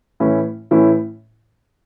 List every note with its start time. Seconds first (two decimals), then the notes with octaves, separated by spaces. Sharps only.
0.20 A2 E3 C#4 E4
0.71 A2 E3 C#4 E4